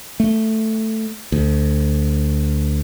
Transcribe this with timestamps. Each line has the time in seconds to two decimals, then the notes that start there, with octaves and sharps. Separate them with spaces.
0.20 A3
1.32 D2